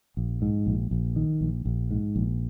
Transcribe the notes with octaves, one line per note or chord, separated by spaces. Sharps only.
A#1
G#2
A#1
A#1
D#3
A#1
A#1
G#2
A#1